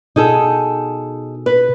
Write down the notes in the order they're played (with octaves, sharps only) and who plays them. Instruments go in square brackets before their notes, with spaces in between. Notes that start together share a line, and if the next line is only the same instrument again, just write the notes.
[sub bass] B2 [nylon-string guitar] D#4 G#4 A4
[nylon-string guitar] B4